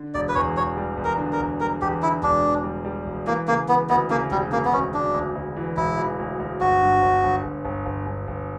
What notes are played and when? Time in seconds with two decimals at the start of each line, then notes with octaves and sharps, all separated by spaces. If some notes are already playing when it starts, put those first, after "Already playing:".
Already playing: D3
0.14 E1 D5
0.29 B4
0.35 E2 C#5
0.56 E1 C#5
0.77 G3
0.97 E2
1.05 A#4
1.18 D3
1.32 A#4
1.39 E1
1.60 G3 A#4
1.82 E2 G4
2.02 D3 E4
2.22 E1 D4
2.44 E1
2.64 G3
2.85 G3
3.07 E1
3.26 E3 A#3
3.48 C#3 A#3
3.69 E3 B3
3.89 D2 B3
4.10 C#3 A#3
4.31 E1 G3
4.52 C#3 A#3
4.65 B3
4.73 D2 C#4
4.93 D2 D4
5.14 D2
5.35 D2
5.57 E3
5.77 E1 E4
5.98 E3
6.19 D2
6.40 D2
6.61 G1 F#4
6.82 G2
7.02 G1
7.24 G1
7.43 G1
7.65 G1
7.86 G1
8.06 G1
8.28 G1